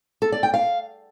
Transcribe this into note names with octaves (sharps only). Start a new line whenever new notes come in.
A4
D5
G5
F5